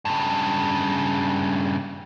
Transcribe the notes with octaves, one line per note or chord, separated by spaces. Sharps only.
G2 C#3